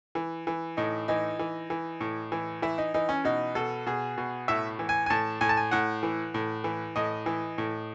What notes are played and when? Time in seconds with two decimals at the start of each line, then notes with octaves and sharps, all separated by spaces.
0.15 E3
0.47 E3
0.77 A2 D#4
1.08 E3 D#4
1.39 E3
1.70 E3
2.01 A2
2.32 E3
2.62 E3 E4
2.78 D#4
2.94 E3 D#4
3.09 C#4
3.24 B2 D#4
3.55 B2 A4
3.86 B2 G#4
4.18 B2
4.48 A2 E5
4.79 E3
4.89 G#5
5.06 G#5
5.10 A2 A5
5.41 A2 G#5
5.49 A5
5.57 G#5
5.71 A2 F#5
6.03 E3
6.34 A2
6.64 E3
6.96 A2 D#5
7.26 E3
7.58 A2